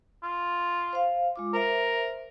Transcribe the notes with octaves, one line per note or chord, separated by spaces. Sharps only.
F4
C5 F5
G#3 F4 D6
A#4 C5 E5